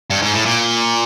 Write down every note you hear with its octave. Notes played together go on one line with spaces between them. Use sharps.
G2
G#2
A2
A#2